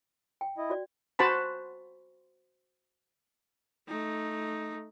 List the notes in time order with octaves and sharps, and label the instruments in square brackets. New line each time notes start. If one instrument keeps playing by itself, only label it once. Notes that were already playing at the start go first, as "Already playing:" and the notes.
[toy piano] G5
[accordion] E4 D#5
[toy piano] F#4 D5
[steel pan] F#4 C5 A5 B5
[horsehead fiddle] A3 D#4